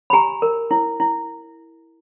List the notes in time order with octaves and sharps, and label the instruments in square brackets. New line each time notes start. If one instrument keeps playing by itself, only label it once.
[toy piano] B5
G4 G#5 A#5
A#4
E4
E4